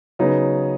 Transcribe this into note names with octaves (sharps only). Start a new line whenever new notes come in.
C#3 F#3 B3 D#4